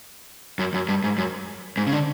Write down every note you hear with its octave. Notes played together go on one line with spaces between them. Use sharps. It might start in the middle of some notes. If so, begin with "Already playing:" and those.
F#2
F#2
G2
G#2
F#2
G#2
C#3
D3